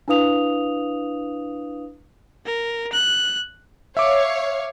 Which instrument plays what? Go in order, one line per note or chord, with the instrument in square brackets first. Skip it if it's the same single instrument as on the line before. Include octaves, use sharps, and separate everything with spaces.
[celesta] D4 E4 B4 F5 D#6 F7
[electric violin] A#4
F#6
[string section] C#5 F5 [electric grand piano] E5 D6